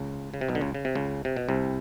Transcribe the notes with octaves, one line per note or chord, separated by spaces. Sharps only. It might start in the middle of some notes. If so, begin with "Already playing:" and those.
Already playing: C#2 C#3
C#3
C3
B1 B2
D3
C#2 C#3
C#3
C3
C#2 C#3
C3
B2
C2 C3